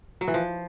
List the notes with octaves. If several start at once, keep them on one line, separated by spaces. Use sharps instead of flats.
F#3
E3
F3